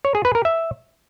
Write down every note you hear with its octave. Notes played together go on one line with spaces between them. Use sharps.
C#5
G#4
B4
A#4
E5